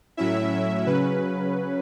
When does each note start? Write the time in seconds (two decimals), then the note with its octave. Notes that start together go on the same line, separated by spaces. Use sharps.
0.17 A2 F#3 C#4 E4 E5
0.86 C#3 F#3 C#4 B4